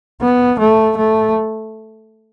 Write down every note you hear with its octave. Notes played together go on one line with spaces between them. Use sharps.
B3
A3
A3